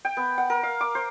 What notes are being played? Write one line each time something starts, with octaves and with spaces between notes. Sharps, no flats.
G5
B3
F#5
A#4
F5
D6
C5